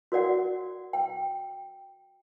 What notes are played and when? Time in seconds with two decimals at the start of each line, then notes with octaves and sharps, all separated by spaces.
0.12 F#4 A#4 D5 F#5
0.93 G5